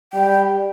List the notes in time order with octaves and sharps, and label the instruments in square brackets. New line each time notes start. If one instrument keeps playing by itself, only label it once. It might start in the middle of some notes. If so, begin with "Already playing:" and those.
[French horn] G3 [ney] G5